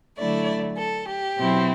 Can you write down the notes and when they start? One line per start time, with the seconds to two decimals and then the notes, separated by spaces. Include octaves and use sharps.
0.18 D3 F#3 A3 E4 D5
0.78 A4
1.08 G4
1.38 B2 F#3 C4 E4